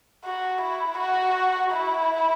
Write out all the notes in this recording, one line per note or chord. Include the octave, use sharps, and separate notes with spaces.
F#4
E4
F#4
E4